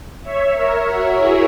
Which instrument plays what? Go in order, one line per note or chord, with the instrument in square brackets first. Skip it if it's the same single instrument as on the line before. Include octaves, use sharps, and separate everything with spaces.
[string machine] C#5 E5
A#4 C#5
F#4 A#4
E4 G#4